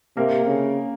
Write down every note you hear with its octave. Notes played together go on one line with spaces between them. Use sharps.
C3 A#3 A#4
C#3